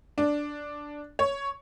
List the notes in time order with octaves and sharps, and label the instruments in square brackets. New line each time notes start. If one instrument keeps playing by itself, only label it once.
[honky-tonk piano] D4
C#5